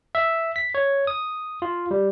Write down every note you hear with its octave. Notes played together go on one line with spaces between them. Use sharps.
E5
B6
C#5
D#6
F4
G3